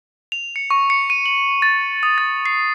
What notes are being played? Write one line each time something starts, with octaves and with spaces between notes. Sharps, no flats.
F7
C#7
C#6
C#7
D#7
F#7
A6
D#6
A6
C7